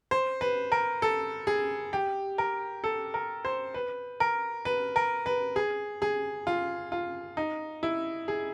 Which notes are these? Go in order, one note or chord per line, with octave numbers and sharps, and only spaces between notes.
C5
B4
A#4
A4
G#4
G4
A#4
A4
A#4
C5
B4
A#4
B4
A#4
B4
G#4
G#4
F4
F4
D#4
E4
G#4